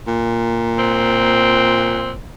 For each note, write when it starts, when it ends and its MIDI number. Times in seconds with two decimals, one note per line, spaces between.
0.07 2.27 46
0.78 2.12 60